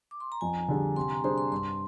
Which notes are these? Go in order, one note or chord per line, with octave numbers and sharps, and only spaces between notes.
D6
C6
A#5
F2 G#5
D3 G3 D4 G#4
C3 C6
A#5
G3 D4 G#4 C5 C6
C6
G2 C6